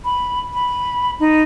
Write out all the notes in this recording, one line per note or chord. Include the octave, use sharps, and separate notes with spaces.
B5
B5
D#4